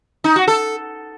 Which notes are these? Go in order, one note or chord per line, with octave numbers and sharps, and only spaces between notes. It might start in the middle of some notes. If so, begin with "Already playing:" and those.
D#4
F#4
A4